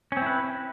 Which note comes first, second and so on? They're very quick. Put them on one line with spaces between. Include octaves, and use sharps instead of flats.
C#4 C4 E4 B4